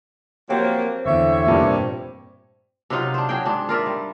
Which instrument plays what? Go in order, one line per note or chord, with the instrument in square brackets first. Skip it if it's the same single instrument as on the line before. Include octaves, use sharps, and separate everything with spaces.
[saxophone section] F3 F#3 A#3 [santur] C4 G4 C5
[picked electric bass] G1 E2 [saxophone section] D3 C#5 E5
[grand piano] F1 G2 A#2
[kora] C3 F#3 D#4 F4
D4 C5
F#3 G#4 G5
G#2 D4
F4 A#4 D5 E5
G3